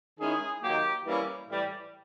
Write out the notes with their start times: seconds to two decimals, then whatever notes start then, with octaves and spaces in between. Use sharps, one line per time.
0.19 D#3 G#3 C#4 E4 G#4
0.63 D#3 F#3 A#3 G4
1.05 E3 G3 A#3 C#4 E4
1.49 A2 E3 G3